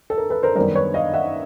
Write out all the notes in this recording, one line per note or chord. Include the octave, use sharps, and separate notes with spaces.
A4
A#4
A4 B4
A#4 C5
F#2 D#3 G3 B3 A#4 C5
B4 C#5
D#5 F5
E5 F#5